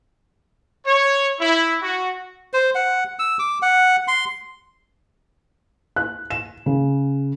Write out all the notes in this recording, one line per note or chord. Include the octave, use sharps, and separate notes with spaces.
C#5
E4
F#4
C5
F#5
E6
D6
F#5
C6
F#6
E7
C#3